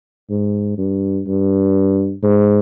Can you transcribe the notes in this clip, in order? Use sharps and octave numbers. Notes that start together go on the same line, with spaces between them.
G#2
G2
G2
G#2